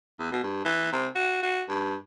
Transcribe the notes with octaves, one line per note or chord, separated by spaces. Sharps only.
E2
B2
G2
E3
C3
F#4
F#4
G2